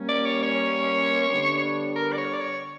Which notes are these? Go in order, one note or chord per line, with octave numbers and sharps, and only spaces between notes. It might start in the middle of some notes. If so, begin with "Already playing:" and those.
Already playing: G3 A#3 C#4
D5
C#5
C#5
D3 G3 B3 D4
A#4
D5
C#5
D5
C#5